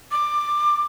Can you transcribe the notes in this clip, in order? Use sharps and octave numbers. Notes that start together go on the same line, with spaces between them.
D6